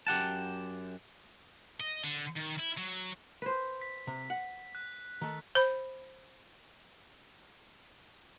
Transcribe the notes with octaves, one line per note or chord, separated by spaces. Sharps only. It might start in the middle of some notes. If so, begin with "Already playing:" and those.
F#2 G4 F#5 A5
D#5
D3
D#3
E4
F#3
B4 C5
B6
C3
F#5
F#6
D#3 A3
C5 B5